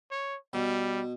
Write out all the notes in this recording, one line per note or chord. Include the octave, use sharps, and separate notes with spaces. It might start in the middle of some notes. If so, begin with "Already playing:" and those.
C#5
B2 G3